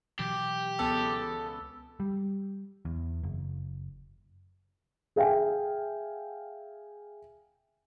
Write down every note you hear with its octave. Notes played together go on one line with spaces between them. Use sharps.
B2 E3 F#3 G4
C#2 B3 A4 E6
G3
E2
F#1
G#4 E5 F5 G5 G#5